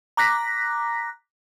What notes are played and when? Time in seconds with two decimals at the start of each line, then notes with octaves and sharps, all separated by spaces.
0.17 A#5 D6 F#6 A#6 B6